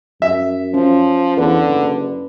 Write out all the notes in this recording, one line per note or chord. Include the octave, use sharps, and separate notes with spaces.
F#2 E5
F3 C#4
E2 D3 B4
F#1